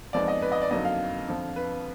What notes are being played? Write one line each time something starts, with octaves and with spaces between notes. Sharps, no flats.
F2 F3 G#3 B3 D#4 D5
D#5
B4
D#5
D5
F2 D3 F#3 A#3 D#4 D#5
F5
F2 D3 F3
B4